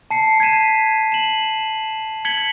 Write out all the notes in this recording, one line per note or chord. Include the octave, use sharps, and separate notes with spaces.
A5 C7 C#7
G#6 B6 D#7 E7
E7 F#7
G#6 B6 C#7 F#7 G7